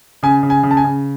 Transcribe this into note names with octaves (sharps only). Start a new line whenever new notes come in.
C#3 G#5
C#3
G#5
C#3
A5
G#5
C#3